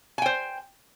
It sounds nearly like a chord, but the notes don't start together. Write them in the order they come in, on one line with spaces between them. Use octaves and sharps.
G#5 G5 C5